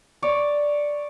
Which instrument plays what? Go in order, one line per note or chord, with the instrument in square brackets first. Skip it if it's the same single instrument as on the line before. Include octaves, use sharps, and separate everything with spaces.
[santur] C#5 D5